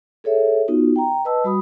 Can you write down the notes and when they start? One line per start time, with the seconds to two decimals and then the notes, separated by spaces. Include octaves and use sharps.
0.24 G#4 A4 C#5 E5
0.68 B3 D#4 F4 F#4
0.96 G5 A#5
1.25 B4 D#5 A5 E6
1.44 G3 F#4 B5 D#6